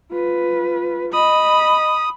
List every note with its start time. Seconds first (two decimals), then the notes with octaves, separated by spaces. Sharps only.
0.11 F4 B4
1.13 D#5 B5 D#6